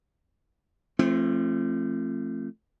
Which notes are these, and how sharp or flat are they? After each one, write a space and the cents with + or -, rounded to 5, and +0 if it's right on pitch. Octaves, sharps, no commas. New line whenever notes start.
F3 -35 A3 +0 C4 +25